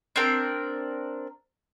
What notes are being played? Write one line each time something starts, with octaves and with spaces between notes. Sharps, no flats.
C4 D4 A#4 G5